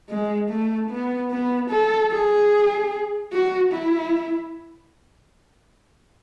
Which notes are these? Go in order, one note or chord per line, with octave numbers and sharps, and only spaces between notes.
G#3
A3
B3
B3
A4
G#4
F#4
E4